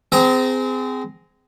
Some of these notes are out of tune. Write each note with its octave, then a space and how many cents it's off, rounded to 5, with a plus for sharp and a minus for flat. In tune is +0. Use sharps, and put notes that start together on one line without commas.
C4 -30 G#4 +0 A#5 +0